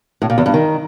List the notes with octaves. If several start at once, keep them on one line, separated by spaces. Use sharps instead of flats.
A2
A#2
E2
G2
D#3